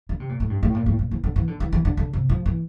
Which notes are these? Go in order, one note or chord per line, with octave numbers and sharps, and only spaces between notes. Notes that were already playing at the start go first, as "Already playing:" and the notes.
D3
C3
A#2
A2
G2
A2
A#2
A2
A#2
E3
D3
E3
D3
E3
E3
D3
D3
C3
F3
E3